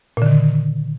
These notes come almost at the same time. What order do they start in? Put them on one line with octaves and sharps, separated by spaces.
A#2 D3 D#3